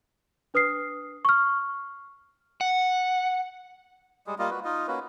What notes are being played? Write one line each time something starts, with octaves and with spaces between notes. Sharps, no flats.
D4 B4 D#6 F6 C7
C#6 F6
F#5
G3 G#3 G#4
G3 A#3 F4 D#5
F#4 B4
D#4 F4 D#5
A#3 C#4 F#4 B4